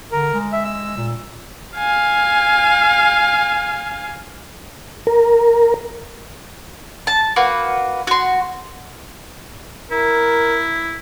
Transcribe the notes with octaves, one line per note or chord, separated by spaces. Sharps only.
D3 A#4
G#3
E5
E6
A#2
F5 G#5
A#4
A5
A#3 F#4 B4
F#4 C6
E4 A#4